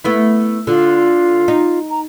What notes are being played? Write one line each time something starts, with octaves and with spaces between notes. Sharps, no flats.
A3 B3 E4
D3 F4
D#4
A#5